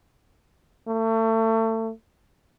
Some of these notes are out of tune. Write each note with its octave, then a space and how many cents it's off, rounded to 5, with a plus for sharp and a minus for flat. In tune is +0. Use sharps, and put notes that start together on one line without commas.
A3 +30